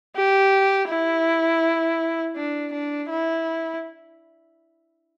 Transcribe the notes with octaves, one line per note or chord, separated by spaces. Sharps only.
G4
E4
D4
D4
E4